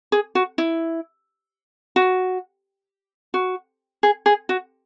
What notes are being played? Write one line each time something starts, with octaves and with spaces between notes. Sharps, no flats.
G#4
F#4
E4
F#4
F#4
G#4
G#4
F#4